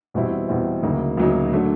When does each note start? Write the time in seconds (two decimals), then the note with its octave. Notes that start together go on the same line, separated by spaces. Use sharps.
0.14 E2 B2 G3 C4 E4
0.48 E2 B2 G3 C4 E4
0.83 D2 C#3 F#3 A#3 D#4
1.17 D2 C#3 F#3 A#3 D#4
1.52 D3 F#3 A3 D4